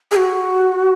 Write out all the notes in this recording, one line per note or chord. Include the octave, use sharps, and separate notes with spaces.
G#4
F#4